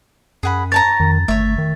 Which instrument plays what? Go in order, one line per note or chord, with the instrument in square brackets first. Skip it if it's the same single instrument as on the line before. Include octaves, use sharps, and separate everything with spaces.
[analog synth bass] F#2 [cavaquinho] G#4 F#5 B5
[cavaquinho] C#5 A5 A#5 [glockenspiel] A6
[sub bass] F2 [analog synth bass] D#3
[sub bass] G1 [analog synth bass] A3 [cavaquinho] C#5 E5
[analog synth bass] D#3